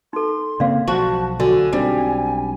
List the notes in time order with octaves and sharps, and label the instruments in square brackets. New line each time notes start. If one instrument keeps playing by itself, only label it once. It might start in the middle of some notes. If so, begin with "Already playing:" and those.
[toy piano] D#4 A4 [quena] C6
[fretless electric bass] C#3 A#3 C4 [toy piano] D5 F5
[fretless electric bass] B1 F3 [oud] F#4 [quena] A5
[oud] D3 [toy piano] F#4 [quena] G#5
[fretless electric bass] B1 C4 D4 [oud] G3 [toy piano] D#4